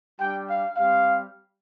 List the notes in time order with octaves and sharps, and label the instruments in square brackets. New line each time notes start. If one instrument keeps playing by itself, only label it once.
[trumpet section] G3 D4 G4 G5
F5
G3 C4 G4 F5